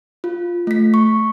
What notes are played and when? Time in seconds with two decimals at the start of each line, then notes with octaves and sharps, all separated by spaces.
0.24 F4
0.67 A3 B6
0.94 C#6